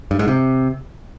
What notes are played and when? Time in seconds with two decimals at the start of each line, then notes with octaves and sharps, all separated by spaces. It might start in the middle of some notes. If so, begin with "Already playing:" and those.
0.11 G2
0.19 G#2
0.28 C3